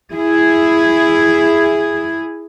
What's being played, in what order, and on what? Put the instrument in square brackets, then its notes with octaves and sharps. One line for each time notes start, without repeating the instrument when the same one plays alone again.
[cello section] E4 G#4